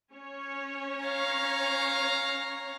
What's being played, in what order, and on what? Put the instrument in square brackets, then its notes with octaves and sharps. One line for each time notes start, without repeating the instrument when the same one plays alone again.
[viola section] C#4 C#5
[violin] F5 A#5